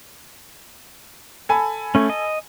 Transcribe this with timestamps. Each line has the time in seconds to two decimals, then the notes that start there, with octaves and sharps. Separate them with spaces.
1.49 A4 G#5 B5
1.95 A3 C#4
2.10 D#5